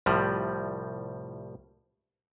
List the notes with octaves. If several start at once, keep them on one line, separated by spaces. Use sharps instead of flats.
C2 A2 F3 G3